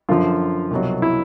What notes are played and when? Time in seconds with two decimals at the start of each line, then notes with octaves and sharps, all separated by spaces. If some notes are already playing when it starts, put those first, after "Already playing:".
0.09 F#2 D3 F3 F4
0.71 C2 B2 F#3
1.02 E4